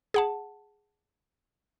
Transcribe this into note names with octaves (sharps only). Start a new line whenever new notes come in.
G#4 F#5 A5